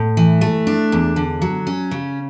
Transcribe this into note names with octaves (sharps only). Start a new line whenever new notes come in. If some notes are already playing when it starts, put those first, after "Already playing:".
Already playing: A2
E3
A3
D4
E2
D3
F#3
C#4
C#3